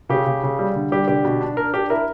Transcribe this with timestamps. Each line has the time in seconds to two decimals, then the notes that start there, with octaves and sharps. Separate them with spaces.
0.09 C#3 G4
0.26 C#3
0.43 C#3
0.59 G3
0.76 D3
0.92 G3 G4
1.08 D3 G4
1.24 B2
1.41 D4
1.57 D4 A#4
1.74 D4 G4
1.90 E4 A#4